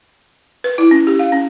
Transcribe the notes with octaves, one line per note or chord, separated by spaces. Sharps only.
B4
E4
C#4
G4
F5
C#4